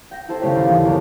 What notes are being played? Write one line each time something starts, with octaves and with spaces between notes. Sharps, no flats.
G5 A#6
E4 G4 A4 C5
D#1 C#3 A3 G4 C#5
D#1 D#2 F5 C6
D3 E3
G1 C2 E3 F#4 A#4 C#5